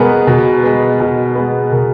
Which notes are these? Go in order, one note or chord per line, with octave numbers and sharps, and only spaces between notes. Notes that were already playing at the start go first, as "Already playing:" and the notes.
Already playing: B2 G#3 B3 G#4 A#4 B4
B2
G#3 B3
B2
G#3 B3
B2 A#4